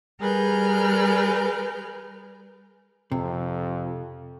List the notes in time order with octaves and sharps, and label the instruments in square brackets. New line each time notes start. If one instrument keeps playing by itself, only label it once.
[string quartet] G3 G#4 A#4 B4 F6 G6
[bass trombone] F2 [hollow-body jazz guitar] C3